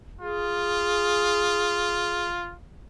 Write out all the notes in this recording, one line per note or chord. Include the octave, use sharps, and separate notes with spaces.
F4 G#4